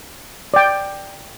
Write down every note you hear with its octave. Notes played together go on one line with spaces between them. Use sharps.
D5 G5